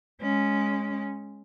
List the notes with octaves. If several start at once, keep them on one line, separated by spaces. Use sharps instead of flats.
G#3 C#4